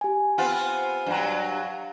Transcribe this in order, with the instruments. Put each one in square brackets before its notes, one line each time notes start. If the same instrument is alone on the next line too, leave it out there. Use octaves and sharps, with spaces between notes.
[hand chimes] G4 G#5
[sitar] B3 C4 F4
G2 F#3